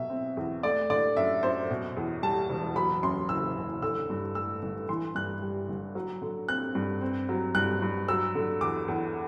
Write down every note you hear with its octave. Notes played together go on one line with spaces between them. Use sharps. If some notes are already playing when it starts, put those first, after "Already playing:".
Already playing: B2 F#3 E5
C4
E2
A3 D5
D3 D5
F#2 E5
F#2 C5
B2
E2
G3 A5
E1
F#3 B5
F#2 C6
F#1 E6
F#1
D3 E6
G2
A3 E6
G1
E3 C6
G2 F#6
G3
G1
F#3
D3
C4 F#6
G2
C4
F#3
G2 F#6
G2
F#3 E6
D3
E2 D6
E2